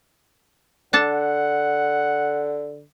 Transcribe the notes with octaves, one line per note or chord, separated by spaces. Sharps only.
D3 D4 A4 F#5 A5